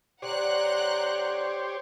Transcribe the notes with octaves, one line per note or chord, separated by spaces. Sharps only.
D3 G4 C5 C#5 F#5 A#5 F#6